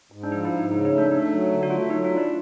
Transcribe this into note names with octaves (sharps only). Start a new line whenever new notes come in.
G#2
D4
F3 D#4
E4
G#2
D#4
C#3 D#4
D#4
A3
D4
A3 D#4
F#3
D3
F#4
A3 F4
F#3 D#4
F4
D4
E4